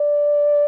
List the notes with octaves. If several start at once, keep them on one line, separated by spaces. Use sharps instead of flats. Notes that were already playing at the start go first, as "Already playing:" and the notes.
Already playing: D5